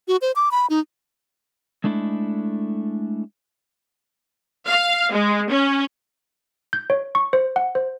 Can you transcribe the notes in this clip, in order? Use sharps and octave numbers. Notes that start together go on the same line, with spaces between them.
F#4
C5
D6
B5
D#4
G#3 A3 D4 E4 A4
F5
G#3
C#4
G6
C#5
C#6
C5
F#5
C5